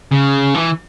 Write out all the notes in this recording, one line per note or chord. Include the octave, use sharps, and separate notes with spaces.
C#3
E3